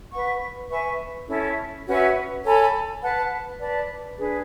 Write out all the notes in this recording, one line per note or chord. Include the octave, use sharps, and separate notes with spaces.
B4 F#5 C#6
B4 E5 G#5 C#6
C#4 E4 A4
C#4 F#4 B4 E5
A4 C#5 G#5 B5
B4 F#5 A5
B4 D5 A5
D4 G#4 B4